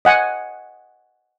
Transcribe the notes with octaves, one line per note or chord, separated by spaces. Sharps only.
D#5 F#5 G#5